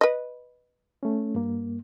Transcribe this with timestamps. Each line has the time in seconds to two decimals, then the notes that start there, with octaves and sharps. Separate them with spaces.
0.01 B4 D#5
1.03 A3 C#4
1.35 G2 A#3